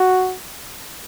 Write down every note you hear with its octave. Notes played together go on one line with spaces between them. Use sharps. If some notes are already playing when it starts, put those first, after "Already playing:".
Already playing: F#4